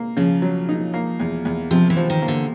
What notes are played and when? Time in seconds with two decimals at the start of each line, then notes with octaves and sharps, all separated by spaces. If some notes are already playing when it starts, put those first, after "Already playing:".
Already playing: A#3
0.17 C#3 F3
0.42 F#3
0.69 D#4
0.94 A#3
1.20 E2
1.45 E2
1.71 C3 F3
1.90 E3
1.96 F3
2.10 D#3
2.22 A#3
2.28 D3